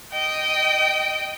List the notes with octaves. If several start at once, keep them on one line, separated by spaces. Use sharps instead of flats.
D#5 G5